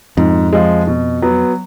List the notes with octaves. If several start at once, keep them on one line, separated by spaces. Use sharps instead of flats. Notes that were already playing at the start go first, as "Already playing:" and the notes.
F2 G#2
F3 G#3
B2
F#3 B3